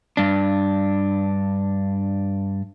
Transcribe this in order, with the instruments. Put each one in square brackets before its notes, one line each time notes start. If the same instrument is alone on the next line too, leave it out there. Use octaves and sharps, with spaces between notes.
[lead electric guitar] G2 D4